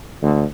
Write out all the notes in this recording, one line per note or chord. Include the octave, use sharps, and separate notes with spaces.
D2